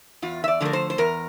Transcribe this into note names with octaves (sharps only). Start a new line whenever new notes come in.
E2 F4
E5
D5
D3 F3 A3 A#4
C5
C5
E2 A#4